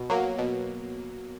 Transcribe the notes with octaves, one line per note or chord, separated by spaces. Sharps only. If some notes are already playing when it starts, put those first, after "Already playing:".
Already playing: B2
F#3 A#3
B2